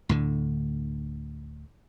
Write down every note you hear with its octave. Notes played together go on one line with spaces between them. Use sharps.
D2 A2 D3